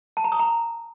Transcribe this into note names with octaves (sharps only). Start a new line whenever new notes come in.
A5
A#5
D#6
A#5